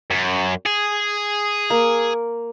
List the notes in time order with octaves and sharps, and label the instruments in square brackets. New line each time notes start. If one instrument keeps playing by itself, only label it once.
[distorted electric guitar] F#2
G#4
[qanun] A#3